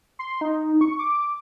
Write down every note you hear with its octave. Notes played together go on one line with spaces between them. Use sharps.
C6
D#4
C#6
D6